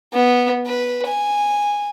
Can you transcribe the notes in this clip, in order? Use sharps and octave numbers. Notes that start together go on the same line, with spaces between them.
B3
B4
G#5